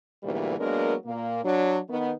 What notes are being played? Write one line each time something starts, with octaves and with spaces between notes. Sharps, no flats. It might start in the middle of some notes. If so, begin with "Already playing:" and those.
D2 G#2 B2 E3 G3 A#3
F#3 G#3 A#3 B3 D4 A#4
A#2 A#3
F#3 D4
D#3 B3